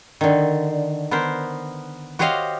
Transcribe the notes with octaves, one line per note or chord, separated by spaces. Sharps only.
D3 D#3
B3 A#4 C5
F#4 G4 C5 C#5 D#5 F5